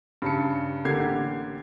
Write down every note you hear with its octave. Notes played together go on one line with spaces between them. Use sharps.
G2 C#3 A5 C#7
A1 D3 A#3 G4 G#6 C7